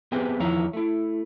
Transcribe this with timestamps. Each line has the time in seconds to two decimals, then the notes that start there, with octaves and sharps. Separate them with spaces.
0.12 B3 C4 G4 G#4 B4 G5
0.40 E2 D#3 F3 E4 C#5 A#5
0.73 A3 E4